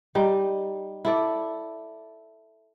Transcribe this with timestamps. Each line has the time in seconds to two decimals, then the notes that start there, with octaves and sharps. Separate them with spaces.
0.15 G3 D#4
1.05 E4 A4 D5